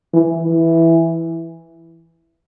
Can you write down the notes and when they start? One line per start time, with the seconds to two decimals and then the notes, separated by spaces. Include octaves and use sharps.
0.14 E3
0.42 E3